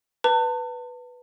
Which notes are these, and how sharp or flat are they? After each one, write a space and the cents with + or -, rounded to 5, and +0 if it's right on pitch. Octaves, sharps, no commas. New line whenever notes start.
B4 +0 A5 +35